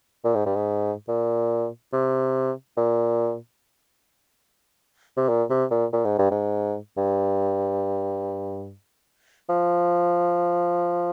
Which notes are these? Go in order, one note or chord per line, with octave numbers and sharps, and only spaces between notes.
A#2
G#2
G2
G#2
A#2
C3
A#2
C3
A#2
C3
A#2
A#2
G#2
G2
G#2
G2
F3